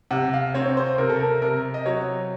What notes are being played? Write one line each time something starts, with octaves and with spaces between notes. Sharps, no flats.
C3 F#5
F5
C4 C#5
C#5
C5
C3 A#4
A4
A#4
C3 A#4
D#5
F#3 C#5